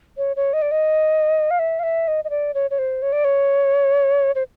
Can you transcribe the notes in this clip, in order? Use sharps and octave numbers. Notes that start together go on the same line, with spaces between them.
C#5
C#5
D#5
D5
D#5
F5
E5
F5
E5
D#5
D#5
D5
C#5
C#5
C5
C#5
D5
C#5
C5